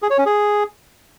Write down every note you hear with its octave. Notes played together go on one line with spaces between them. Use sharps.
G#4
C#5
C#4
G#4